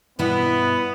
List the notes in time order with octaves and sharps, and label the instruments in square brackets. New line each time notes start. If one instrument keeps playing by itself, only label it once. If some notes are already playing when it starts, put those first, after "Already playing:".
[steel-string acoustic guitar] G2 B2 E4 [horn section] B3